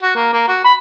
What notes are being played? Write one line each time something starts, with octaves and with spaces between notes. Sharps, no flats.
F#4
A#3
A#3
F#4
B5